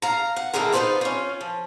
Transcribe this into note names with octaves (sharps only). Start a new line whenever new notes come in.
F5 A#5
F#5
D3 E3 G3 G#3 A#4
D#4 F4 G4 B4 C5 D5
C#4 F4
F3